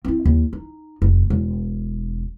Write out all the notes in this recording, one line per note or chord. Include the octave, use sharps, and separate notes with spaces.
C4 E4
D#2
D#4
F1
E1